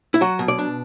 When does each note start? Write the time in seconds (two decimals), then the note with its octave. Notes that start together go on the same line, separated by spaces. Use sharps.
0.14 E4
0.21 F#3 F#4
0.39 B2
0.48 D5
0.58 D4